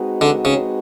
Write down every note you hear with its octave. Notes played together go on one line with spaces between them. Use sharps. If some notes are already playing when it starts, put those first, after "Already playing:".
Already playing: G#3 C4 D#4 F#4 B4
D3
C#3